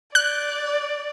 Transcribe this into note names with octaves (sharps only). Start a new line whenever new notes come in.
D5 F#6